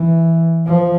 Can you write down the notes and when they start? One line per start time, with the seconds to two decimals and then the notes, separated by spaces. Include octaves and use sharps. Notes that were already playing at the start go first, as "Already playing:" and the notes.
Already playing: E3
0.67 F3